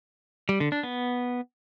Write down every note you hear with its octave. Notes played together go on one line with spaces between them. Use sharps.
G3
D3
D4
B3